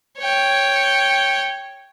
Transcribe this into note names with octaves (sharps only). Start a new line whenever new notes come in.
C#5 G5